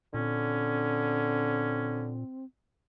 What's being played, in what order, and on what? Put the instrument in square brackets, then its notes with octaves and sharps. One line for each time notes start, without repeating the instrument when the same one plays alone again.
[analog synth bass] A#2 [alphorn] D3 [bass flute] C4 [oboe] C#4